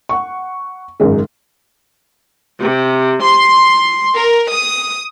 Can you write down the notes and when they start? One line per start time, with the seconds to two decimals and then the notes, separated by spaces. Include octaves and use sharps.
0.09 F#5 C#6
1.00 G#1 F#2 C#3 G#3
2.59 C3
3.21 C6
4.17 A#4
4.52 D#6